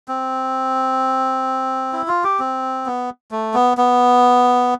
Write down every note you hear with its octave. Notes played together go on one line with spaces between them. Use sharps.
C4
E4
F4
G4
C4
B3
A3
B3
B3